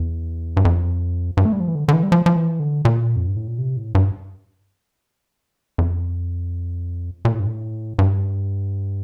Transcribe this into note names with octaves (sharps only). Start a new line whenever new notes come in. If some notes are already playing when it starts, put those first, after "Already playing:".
Already playing: E2
G2
F2
G2
A3
G3
F3
E3
D3
D3
E3
G3
F3
F3
E3
D3
A#2
F2
G2
A2
A#2
C3
A2
G2
F2
A#2
A2
G2
A2
G2